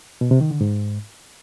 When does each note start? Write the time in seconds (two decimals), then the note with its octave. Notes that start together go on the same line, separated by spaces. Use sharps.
0.21 B2
0.31 C3
0.41 D#3
0.51 D3
0.61 G#2